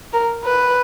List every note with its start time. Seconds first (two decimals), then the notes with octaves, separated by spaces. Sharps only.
0.13 A#4
0.45 B4